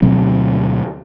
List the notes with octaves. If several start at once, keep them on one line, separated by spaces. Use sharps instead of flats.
D2 B2 F#3 C4